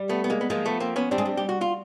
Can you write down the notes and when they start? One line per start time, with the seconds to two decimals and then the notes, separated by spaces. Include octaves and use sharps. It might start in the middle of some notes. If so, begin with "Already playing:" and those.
Already playing: G3
0.09 A3 B3
0.24 B3
0.30 G#3 A#3
0.41 B3
0.50 F3 G#3 A#3
0.66 A3 B3
0.80 A#3 C4
0.96 B3 C#4
1.11 G3 C4 D4
1.18 G#3
1.25 G3
1.37 G4
1.49 F#4
1.61 F4